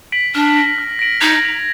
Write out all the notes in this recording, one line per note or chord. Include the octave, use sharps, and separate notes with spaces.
B6 D7 F#7
D4 F6
A#6 D7 F#7
F6
A#6 D7 F#7
D#4 G#6
B6 F7